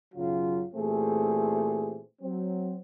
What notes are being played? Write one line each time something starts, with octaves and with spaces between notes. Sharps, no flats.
B1 F#2 C#3 F#3 F4
A#2 E3 A3 C4 G4 G#4
F#3 C4